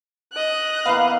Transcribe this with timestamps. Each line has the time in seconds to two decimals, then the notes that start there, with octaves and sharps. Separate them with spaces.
0.33 D#5 F#6
0.86 E3 A#3 B3 F5